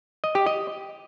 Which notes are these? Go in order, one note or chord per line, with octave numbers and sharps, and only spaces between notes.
D#5
G4
D#5